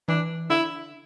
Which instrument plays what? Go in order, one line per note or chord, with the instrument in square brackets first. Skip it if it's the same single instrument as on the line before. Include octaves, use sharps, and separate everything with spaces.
[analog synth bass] E3 [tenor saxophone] D4
[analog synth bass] D3 [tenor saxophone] E4